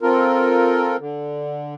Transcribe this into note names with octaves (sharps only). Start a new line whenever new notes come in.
C4 F4 A4 A#4
D3